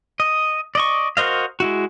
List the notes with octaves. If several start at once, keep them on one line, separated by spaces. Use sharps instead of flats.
D#5
D5 D#5 C#6
F#4 A#4 C5 D#5 F5
G#3 E4 F#4